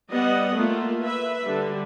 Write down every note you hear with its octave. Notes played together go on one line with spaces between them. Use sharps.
G3 B3 D#5 F#5
A3 A#3 F4
B4 E5
D3 G3